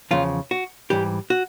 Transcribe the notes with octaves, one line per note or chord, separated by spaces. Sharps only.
E2 C#3 F3 F4
F#4
G#2 E3 G3 G4
F#4